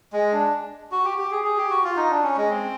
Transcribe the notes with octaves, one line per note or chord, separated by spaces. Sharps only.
G#3
D4
F#4
G4
G4
G#4
G#4
G4
F#4
F4
D#4
D4
C#4
G#3
C4